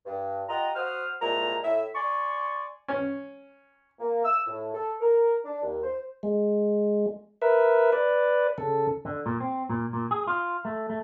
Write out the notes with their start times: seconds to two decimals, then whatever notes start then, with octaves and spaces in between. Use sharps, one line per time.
0.06 G2
0.49 F4 G4 D#5 F#5 A#5
0.75 F#4 C5 D#6 F6
1.22 C2 A#2 G#3 A3 A#5
1.63 A2 E5
1.95 D5 G#5 C6 C#6
2.89 C#4
4.00 A#3
4.24 E6
4.47 A2
4.74 A4
5.00 A#4
5.45 D4
5.62 D#2
5.84 C5
6.23 G#3
7.42 A#4 B4 E5
7.92 B4 D5
8.58 C#3 A4
9.05 D3
9.26 A#2
9.40 C4
9.69 A#2
9.93 A#2
10.11 G#4
10.27 F4
10.65 A3
10.90 A3